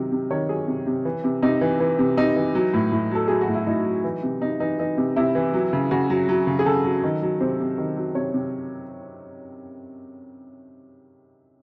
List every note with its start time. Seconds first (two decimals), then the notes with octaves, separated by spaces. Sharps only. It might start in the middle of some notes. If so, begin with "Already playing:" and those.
Already playing: C3 D#3 F#3
0.12 C3
0.30 D#3 C#5
0.49 F#3 G#4
0.67 C3
0.87 C3
1.05 E3
1.24 C3
1.42 C3 D#4
1.61 E3
1.80 E3
1.99 C3
2.17 C3 D#4
2.36 E3
2.55 F#3
2.74 A2
2.92 A2
3.11 F#3 A4
3.28 F#3 G#4
3.41 F#4
3.48 A2
3.54 E4
3.67 A2 D#4
3.86 F#3
4.04 E3
4.23 C3
4.42 C3 D#4
4.60 E3 D#4
4.79 E3 D#4
4.97 C3
5.16 C3 E4
5.35 E3
5.54 F#3
5.73 C#3
5.91 C#3 F#4
6.10 F#3
6.29 F#3
6.47 C#3
6.59 G#4
6.66 C#3 A4
6.84 F#3
7.03 D#3
7.22 F#3
7.41 C3 C5
7.60 C3
7.78 D#3
7.97 F#3
8.15 C3 C#5
8.34 C3